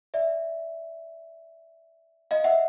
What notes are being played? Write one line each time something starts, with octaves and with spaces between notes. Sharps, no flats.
D5 E5
D#5 F5
E5 F#5